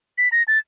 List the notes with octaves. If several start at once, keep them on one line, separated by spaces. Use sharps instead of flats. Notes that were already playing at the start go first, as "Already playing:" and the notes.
B6
A#6
A6